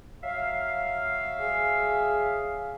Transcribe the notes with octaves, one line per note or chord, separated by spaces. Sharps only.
F#3 E5 F5
G#4